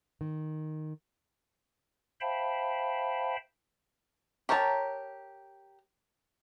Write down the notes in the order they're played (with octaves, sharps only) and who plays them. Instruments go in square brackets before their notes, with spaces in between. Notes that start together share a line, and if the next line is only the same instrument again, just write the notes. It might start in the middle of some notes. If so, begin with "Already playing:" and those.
[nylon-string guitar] D#3
[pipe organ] C5 E5 F5 G5 A5 B5
[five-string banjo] G4 A#4 C#5 A5 A#5